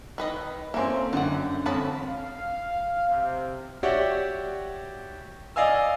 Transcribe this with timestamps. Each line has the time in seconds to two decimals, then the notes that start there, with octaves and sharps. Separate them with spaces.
0.18 D#3 B4 D#5
0.74 A#3 C4 C#4 A4 E5 G#5 C6
1.13 F#2 D3 G4 F#5
1.66 F2 C#4 A5 B5
2.02 F5
3.09 C3
3.83 F#4 G4 C#5 D5 E5 F#5
5.56 D5 D#5 F5 G#5 E6